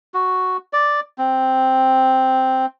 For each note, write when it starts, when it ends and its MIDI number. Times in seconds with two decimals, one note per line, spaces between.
0.14 0.57 66
0.73 1.00 74
1.18 2.66 60